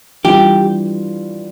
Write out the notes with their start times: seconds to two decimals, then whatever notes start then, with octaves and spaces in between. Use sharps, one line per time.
0.24 E3 G3 D4 F4 G4